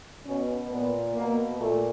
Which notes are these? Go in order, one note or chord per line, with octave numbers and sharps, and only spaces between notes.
B2 C#4
A#2 B3
B2 A#3
A#2 A3